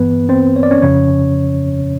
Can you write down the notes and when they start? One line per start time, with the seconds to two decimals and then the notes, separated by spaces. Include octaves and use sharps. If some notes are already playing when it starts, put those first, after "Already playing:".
Already playing: G2 E3 B3 B4
0.29 C4 C5
0.56 C#5
0.63 D5
0.71 C#4 C#5
0.82 F2 C#3 F3 C#4 C#5